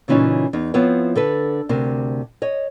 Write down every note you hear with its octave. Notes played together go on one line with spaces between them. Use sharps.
A#2 C#3 E3 C#4 D#4 F4
E2 D#4
F3 B3 C4 E4 C#5
D3 A4 B4
D2 C3 A#4
C#5 D#5